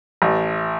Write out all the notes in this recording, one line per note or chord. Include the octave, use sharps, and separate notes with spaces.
A1